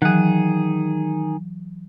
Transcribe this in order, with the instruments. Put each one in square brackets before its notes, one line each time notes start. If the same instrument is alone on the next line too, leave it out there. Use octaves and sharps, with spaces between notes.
[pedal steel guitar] D#3 G#4 [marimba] E3 F#3 F#6